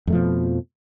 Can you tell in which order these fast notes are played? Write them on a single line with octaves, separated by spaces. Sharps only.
F2 A3 F3 B2